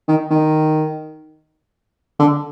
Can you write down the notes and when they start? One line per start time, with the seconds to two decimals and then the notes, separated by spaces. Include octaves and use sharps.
0.08 D#3
0.31 D#3
2.19 D3